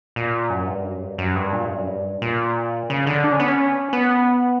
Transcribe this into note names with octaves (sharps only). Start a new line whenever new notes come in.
A#2
F#2
G2
F#2
G2
F#2
G2
A#2
G2
F#2
G2
A#2
C#3
D3
D4
C#4
B3
C#4
B3